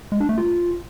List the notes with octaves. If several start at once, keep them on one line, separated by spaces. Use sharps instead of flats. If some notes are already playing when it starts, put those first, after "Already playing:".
G#3
D4
A3
F4